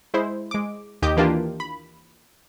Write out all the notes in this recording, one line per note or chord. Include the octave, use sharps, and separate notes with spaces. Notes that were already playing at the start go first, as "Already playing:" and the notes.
G#3 E4 C5
G#3 D6
D#2 G4 D#5 D6 G6
E3 A#3 D4 F4 G4
B5